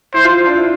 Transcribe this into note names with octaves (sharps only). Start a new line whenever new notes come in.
E4 C5
F4
D4
E4